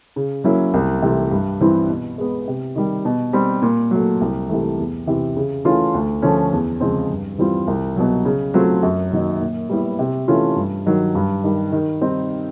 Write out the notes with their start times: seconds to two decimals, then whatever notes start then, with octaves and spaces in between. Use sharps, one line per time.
0.16 C#3
0.44 F#3 A#3 C#4 E4
0.74 C2
1.02 C3 E3 A3
1.31 G2
1.61 E3 G3 C4 E4
1.89 B2
2.18 G#3 B3
2.48 C3
2.75 D#3 G3
3.05 B2
3.33 G3 C4
3.62 A#2
3.91 F#3 A3
4.21 C2
4.49 C3 E3 A3
4.79 E2
5.07 C3 E3
5.36 C#3
5.65 E3 A3 C#4 F4
5.94 D2
6.22 D3 F3 A3 C#4
6.52 E2
6.80 C#3 F3 G#3 C4
7.10 G2
7.38 E3 G3 C4 F4
7.67 C2
7.96 B2 F#3
8.25 C#3
8.54 F#3 A3 C4 F4
8.83 F#2
9.13 D#3 F#3 A#3 D#4
9.41 A#2
9.69 G3 B3 E4
9.99 C3
10.28 E3 A3 C#4 F4
10.56 G2
10.86 D#3 F#3
11.15 G2
11.44 D#3 G3
11.72 D#3
12.01 G3 C4 D#4